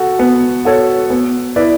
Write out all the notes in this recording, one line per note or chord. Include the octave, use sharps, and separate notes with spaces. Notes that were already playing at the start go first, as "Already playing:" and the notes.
Already playing: F#4 A4
B3
F#4 A4 C#5
B3
E4 B4 D5